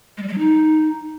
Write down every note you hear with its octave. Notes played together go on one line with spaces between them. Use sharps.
G#3
G3
G#3
F#3
D#4